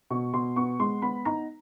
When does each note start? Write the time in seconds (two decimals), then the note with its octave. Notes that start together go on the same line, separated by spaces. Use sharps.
0.10 B2 C#6
0.34 B2 C6
0.56 B3 C#6
0.80 G#3 C6
1.02 B3 B5
1.25 D#4 A#5